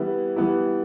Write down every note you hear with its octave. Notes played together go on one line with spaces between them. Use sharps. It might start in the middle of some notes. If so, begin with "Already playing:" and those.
Already playing: E3 G3 B3 E4
E3 G3 B3 E4